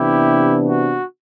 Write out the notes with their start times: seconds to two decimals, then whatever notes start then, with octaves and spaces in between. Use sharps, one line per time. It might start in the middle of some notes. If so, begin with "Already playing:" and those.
Already playing: C3 E3 B3 D4 E4 G4
0.65 F#4